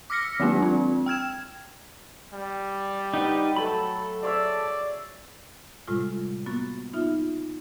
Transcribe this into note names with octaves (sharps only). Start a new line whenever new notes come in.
D6 E6 F6 A#6 B6 C#7
D#3 F#3 G#3 A#3 D4
C4 F4
G5 F6 G#6 E7
G3
D#4 G4 B4 F#5 G5
F#3 A3 A4 B5
G#4 C#5 D5 E5
A2 C3 G3 G#3 F4
A#3 B3 F#4 C#6 A6
B3 D#4 F4 E5